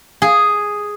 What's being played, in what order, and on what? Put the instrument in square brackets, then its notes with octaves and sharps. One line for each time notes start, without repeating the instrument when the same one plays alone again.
[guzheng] G#4